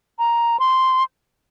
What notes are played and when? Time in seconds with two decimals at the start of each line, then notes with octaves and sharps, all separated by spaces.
0.19 A#5
0.60 C6